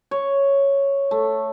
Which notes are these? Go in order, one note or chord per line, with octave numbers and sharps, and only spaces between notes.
C#5
A3